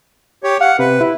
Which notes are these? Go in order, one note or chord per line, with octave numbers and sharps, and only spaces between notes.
G4 C#5
F5 F#5
C3 B4
E4